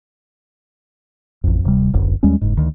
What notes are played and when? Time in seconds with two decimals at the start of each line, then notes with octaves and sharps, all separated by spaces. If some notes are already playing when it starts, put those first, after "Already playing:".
1.44 A1 F2
1.64 D1 C3 G3
1.93 D1 G1 F#2
2.23 D#2 G3 G#3 C#4
2.41 F#1 G#2
2.57 D2 D#3